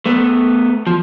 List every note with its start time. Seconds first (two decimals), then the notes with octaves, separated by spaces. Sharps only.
0.06 A3 B3
0.87 F3